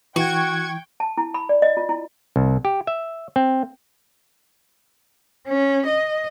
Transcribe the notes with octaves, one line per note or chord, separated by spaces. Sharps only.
E3 F#4 G5 C#6 G#6
A5
E4
B5
D5
D#5
F4
E4
C2
G4
E5
C4
C#4
D#5